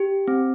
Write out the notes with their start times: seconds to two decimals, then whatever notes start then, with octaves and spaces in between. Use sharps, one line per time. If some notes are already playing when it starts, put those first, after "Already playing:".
Already playing: G4
0.28 C4